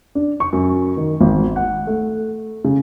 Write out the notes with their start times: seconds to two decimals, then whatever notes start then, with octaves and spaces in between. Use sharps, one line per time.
0.15 D4
0.40 C#6
0.53 F#2
0.97 D#3
1.21 G#1
1.56 F#5
1.87 A3
2.65 C#3